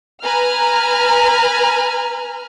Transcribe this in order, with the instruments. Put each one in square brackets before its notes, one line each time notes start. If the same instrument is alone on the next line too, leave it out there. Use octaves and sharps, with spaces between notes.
[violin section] B4 G#5 A#5 F6